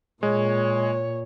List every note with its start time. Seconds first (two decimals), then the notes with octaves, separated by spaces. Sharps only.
0.23 A#2 G#3 C#5